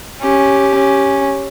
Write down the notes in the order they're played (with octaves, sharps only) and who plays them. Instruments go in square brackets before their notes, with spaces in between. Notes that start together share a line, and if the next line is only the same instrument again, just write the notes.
[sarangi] C#4 [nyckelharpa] G4
[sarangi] C#4